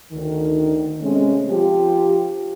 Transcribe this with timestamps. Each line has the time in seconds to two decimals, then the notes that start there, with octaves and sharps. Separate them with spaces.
0.11 D2 D3 D#3
1.02 C3 G#3 A3 C4 C#4
1.49 F3 F4 G4